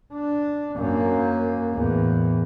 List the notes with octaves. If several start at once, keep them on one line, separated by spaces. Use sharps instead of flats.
D4
F#2 A#3
E2 A2